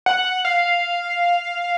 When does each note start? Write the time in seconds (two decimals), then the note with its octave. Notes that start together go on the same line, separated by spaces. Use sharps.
0.06 F#5
0.45 F5